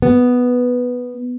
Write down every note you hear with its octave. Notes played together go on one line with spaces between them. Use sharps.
B3